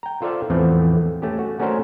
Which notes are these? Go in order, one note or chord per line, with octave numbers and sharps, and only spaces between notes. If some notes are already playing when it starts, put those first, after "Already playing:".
G5 A#5
F4 A4 C5 D5 E5 F5
E2 A2 E3 F3 A3 C4
A3 C#4 G4
F#4
A3 C#4 D4 F#4 A#4 C5